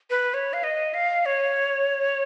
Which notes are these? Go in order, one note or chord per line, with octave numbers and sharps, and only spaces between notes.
B4
C#5
F5
D#5
F5
C#5